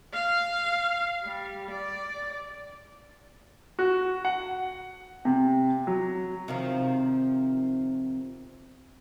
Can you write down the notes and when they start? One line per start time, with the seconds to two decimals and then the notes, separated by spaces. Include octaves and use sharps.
0.13 F5
1.24 G3
1.71 D5
3.79 F#4
4.25 F#5
5.25 C3
5.87 F#3
6.48 C3 D#3 F3